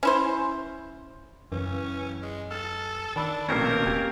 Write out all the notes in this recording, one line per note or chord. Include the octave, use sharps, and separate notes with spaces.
C#4 E4 C5
F#2 C#3 E3 C#4
G#3
A4 F6 A6
D#3 D4 A5 B5 E6
A#1 B2 A3 A#3 C4 C#4 A#4
D1 G4 G#6